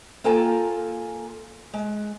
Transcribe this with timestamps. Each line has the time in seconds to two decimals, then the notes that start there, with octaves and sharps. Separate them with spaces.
0.24 A#3 F4 A4 G5 G#5 A#5
1.74 G#3